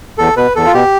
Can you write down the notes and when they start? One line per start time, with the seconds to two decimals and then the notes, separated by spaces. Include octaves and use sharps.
0.18 E2 A4
0.37 B2 B4
0.55 E2 A4
0.66 F4
0.74 B2 G4